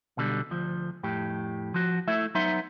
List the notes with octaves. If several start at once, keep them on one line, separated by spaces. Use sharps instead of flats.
B1 B2 D3 G3
D2 F3
F2 A2 G4
F3 F#4
A3 E4 E5
F#3 B3 D#4 E5 C6